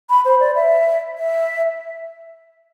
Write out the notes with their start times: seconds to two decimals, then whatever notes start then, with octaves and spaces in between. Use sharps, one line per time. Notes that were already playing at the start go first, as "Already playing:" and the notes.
0.10 B5
0.25 C5
0.40 D5
0.55 E5
1.18 E5